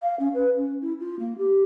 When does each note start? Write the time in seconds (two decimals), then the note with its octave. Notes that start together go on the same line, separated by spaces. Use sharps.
0.02 F5
0.19 C#4
0.34 B4
0.57 C#4
0.81 E4
1.00 F4
1.19 A#3
1.38 G4